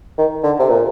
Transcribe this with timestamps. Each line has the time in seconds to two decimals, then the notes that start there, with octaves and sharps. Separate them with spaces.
0.18 D#3
0.43 D3
0.59 C3
0.70 A#2